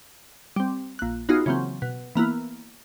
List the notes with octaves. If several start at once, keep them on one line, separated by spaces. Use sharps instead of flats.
G3 C4
A#1 F#6
B3 D#4 F4 F#4 G#4
C#3 E3 F#3 A#3 C4
B2
E3 A#3 B3 E4